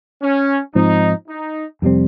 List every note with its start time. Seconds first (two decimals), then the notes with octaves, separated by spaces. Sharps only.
0.22 C#4
0.75 G#2 F3 C4 D#4
1.28 D#4
1.82 F2 C3 G3 C4